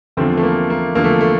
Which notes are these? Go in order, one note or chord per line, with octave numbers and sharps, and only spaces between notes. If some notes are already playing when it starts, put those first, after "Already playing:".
E2 D3 F3 A3 C4
A3
A#3
A#3
E2 D3 F3 A#3
A3
A3